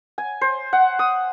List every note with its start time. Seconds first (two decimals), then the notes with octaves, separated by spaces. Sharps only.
0.18 G#5
0.41 C5
0.73 F#5
0.99 D#6